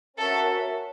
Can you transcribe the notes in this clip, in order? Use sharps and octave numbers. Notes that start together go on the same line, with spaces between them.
C#4 F#4 A4 A#4 C#5 E5